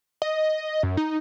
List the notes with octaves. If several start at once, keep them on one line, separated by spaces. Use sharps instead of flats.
D#5
F#2
D#4